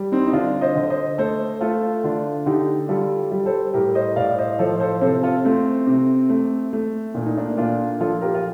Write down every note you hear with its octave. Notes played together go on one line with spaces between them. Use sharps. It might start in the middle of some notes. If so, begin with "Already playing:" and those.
Already playing: G3
C4 D#4
D#4
D3 D4 F4
C5 D#5
D3
C5 D#5
A3 A4 C5
A3 F4 A4
D3 D4 F4
D3 D#4 G4
G3 F4 A4
G3
A4 C5
A2 G4 A#4
C5 D#5
A2 D5 F5
C5 D#5
F3 A4 C5
A4 C5
C3 A4 C5
F4 A4
A3 C4
C3
A3
A3
A#2 D4
D#4
A#3 D4
A#2 D4 F4
F3 F4 A4
G4 A#4
F4